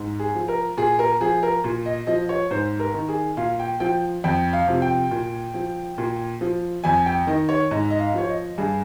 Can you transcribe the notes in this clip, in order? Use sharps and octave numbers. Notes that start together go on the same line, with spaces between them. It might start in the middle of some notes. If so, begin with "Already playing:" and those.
Already playing: G#2
G#4
F3
A#4
A#2 G#4
A#4
F3 G#4
A#4
A#2
D#5
F3 D#5
C#5
G#2 C5
A#4
D#3
G#4
A#2 F5
G5
F3 G5
F2 G5
F5
C3 F3
G5
A#2
F3
A#2
F3
F2 G#5
G5
D#3 D#5
C#5
G#2 D#5
D#5
F5
F3 C#5
D#5
G2 G#4